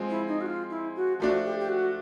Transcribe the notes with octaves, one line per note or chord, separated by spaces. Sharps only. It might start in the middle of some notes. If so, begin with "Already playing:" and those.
Already playing: F3 G#3 C4
E4
D#4
F#4
F4
E4
F#4
F3 A3 D4 F#4
G4
G4
F#4